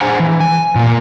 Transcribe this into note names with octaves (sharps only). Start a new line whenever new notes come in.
D4 G#4 C5 F#5 G#5 A#5
E3
G#5
A#2 A#3